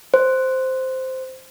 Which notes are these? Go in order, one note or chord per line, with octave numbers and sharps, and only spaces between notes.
C5